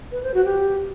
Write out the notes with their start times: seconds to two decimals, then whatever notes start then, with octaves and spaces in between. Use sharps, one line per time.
0.12 B4
0.23 C5
0.34 F#4
0.45 G4